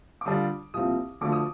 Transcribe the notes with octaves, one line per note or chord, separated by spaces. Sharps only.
D6
D3 G3 D4 F4 D#6
C2 A#2 F3 C4 D#6
D2 D3 F3 D6
D#6